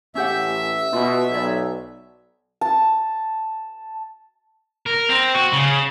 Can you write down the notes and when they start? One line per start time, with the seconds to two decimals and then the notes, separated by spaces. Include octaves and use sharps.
0.15 A1 C#4 G4 E5 F#5
0.93 B2 F4 F#4
1.31 B1 C#5 D5
2.61 A5
4.86 A#4
5.09 C4
5.34 F#4
5.53 C#3